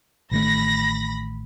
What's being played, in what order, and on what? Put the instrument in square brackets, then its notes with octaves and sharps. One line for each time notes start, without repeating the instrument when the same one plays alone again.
[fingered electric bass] A1 D#3 A3 [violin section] B5 A#6